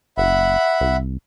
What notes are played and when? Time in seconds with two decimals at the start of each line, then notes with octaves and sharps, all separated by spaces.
0.18 F#1 E5 F#5 B5
0.81 C2